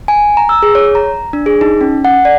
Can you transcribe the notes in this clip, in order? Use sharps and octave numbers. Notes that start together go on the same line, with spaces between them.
G#5
A#5
E6
G#4
C#5
A#5
D4
G#4
D#4
C#4
F#5
D5